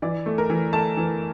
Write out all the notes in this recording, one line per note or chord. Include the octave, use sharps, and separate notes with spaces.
E3 D5
A3
A#4
E3
A3 A5
E3